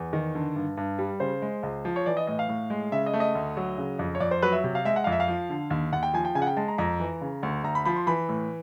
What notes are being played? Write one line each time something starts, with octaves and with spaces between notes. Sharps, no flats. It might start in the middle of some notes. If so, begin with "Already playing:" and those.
Already playing: E2
D#3
D3
G2
G2
G3
C#3 C5
G#3
C#2
F3
C#5
E3 D5
D#5
A2 D#5
F5
A2
G#3
C#3 E5
D#5
A3
D#5
D2
F#3
C#3
F2
C#5
F2 D5
C5
F#3 B4
E5
C3
F5
G#3 E5
F#5
F2 F5
E5
F5
F3
D3
D#2
D#2 F#5
G5
F3 G#5
G5
C#3 G#5
F#5
G5
G#3 A5
A#5
F2 A#5
E3
C#3
D2
D2 A#5
B5
F3 B5
C6
E3 B5
A2